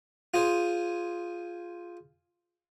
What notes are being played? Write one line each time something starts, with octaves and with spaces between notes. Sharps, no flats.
F4 G#4 C5